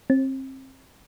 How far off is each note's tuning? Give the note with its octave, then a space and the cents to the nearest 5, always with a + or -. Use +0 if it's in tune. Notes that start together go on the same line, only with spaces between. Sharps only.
C4 +30